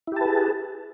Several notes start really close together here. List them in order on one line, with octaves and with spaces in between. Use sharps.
E4 G4 A5 B4 G#4